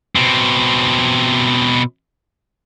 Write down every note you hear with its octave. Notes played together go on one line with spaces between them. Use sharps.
B2 C4